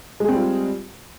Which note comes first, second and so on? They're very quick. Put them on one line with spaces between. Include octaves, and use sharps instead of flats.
G#3 G#4 C4 G3 F4